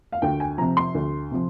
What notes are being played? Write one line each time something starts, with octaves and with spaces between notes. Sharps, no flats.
F5
D2 G5
G#5
C3 F3 A#5
C6
D2
C3 F3